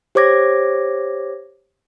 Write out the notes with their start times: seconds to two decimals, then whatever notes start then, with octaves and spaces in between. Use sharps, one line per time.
0.15 G4 C5 C#5 D6 G#6 A#6